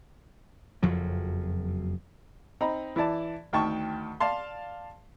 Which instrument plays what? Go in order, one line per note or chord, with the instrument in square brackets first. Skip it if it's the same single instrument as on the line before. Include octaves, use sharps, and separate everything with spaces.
[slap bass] F#1 F2 F3 F#3
[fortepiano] C4 D#4 A#5 B5
E3 E4 D5 A5
D2 D#3 G5 A5 C#6
D5 F5 A5 C6